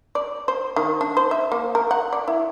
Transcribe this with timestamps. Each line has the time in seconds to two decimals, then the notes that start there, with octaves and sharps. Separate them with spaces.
0.15 D5
0.48 C5
0.76 D#3
1.01 D4
1.17 C5
1.31 E5
1.52 A#3
1.75 A#4
1.91 F#5
2.13 D5
2.28 E4